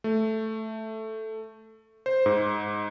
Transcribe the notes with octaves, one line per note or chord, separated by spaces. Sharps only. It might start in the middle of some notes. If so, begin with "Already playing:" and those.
A3
C5
G#2